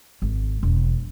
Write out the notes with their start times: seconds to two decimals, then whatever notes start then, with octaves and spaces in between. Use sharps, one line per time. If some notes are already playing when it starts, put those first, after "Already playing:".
0.22 G#1
0.63 E1